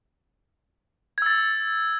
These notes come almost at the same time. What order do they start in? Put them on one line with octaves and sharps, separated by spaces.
G#6 E6 A6